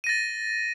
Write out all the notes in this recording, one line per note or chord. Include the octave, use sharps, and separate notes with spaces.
A6 A#6 D#7